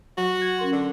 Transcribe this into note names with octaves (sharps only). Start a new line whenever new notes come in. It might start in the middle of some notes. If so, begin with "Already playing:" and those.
F#3 F#4
G#6
C#4 A#4 C6
D3